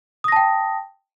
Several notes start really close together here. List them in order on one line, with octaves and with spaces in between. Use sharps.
D#6 A#6 A5 G5